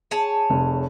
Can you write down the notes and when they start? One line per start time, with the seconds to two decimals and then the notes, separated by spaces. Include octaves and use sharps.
0.11 G#4 C#5 A5
0.50 F1